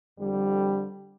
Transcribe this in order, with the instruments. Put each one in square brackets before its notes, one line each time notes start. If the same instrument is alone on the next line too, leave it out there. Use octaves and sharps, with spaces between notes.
[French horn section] F2 D3 G3